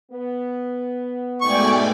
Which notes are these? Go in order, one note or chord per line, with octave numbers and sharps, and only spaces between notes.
B3
G#2 B2 A3 D5 G5 G#5 C#6